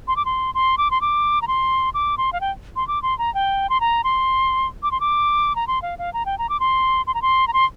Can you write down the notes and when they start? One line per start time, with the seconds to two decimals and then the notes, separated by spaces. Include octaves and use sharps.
0.08 C6
0.16 D6
0.25 C6
0.55 C6
0.78 D6
0.91 C6
1.01 D6
1.42 A#5
1.48 C6
1.94 D6
2.18 C6
2.33 F5
2.41 G5
2.76 C6
2.88 D6
3.03 C6
3.19 A#5
3.34 G5
3.70 C6
3.81 A#5
4.04 C6
4.83 D6
4.91 C6
5.00 D6
5.56 A#5
5.67 C6
5.82 F5
5.99 F5
6.13 A#5
6.26 G5
6.38 A#5
6.49 D6
6.60 C6
7.07 C6
7.14 A#5
7.22 C6
7.48 A#5
7.53 C6